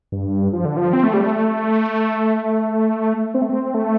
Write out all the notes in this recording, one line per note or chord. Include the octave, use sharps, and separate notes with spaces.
G2
F3
D3
F3
C4
A3
G3
A3
C4
A3
C4
A3